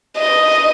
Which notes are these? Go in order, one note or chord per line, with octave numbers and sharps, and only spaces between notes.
D#5